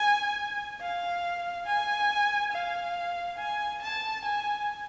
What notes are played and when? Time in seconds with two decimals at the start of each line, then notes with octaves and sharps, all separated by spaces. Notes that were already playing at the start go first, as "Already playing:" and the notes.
Already playing: G#5
0.81 F5
1.66 G#5
2.52 F5
3.38 G#5
3.82 A5
4.24 G#5